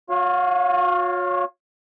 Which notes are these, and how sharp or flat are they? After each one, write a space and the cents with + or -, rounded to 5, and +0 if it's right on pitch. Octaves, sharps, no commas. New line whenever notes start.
F#4 -45 C#5 +0 F5 +0